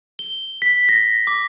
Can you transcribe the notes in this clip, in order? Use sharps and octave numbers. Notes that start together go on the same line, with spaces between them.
G7
B6
A#6
D6